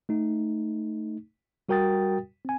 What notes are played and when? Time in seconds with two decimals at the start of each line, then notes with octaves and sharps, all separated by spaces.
0.09 A3 D#4
1.69 G3 F#4 A#4 G5 D#6 A6
2.45 C4 G#5